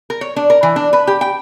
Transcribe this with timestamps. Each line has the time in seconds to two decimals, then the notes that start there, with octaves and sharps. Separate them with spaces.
0.10 A#4
0.21 C#5
0.36 D4
0.50 A#4
0.63 E3
0.76 D4
0.93 B4
1.07 G4
1.21 G5